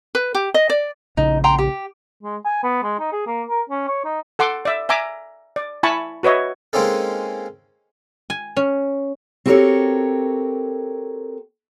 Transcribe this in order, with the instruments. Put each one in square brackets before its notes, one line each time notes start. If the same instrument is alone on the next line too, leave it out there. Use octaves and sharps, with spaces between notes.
[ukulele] B4
G4
D#5
D5
[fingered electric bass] A#1 C#3 [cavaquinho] D#4
[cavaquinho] G5 A#5 C6
G4
[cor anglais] G#3
G#5
B3
G#3
D#4
G#4
A#3
A#4
C#4
C#5
D#4
[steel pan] A4 F#5 C6 D6
D5 E5
E5 G#5 A#5 D6
D5
E4 G#5 A5 B5 C#6
F#4 B4 C#5 D#5 E5
[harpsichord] G#3 A#3 C4 C#4 D#4 A4
[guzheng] G#5
C#4
[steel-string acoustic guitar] C4 F#4 G4 A4 A#4 C#5